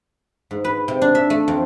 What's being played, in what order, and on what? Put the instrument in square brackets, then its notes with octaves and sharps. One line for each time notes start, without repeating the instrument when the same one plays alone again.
[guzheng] G#2
B4
C3
D4
E5
A3
F2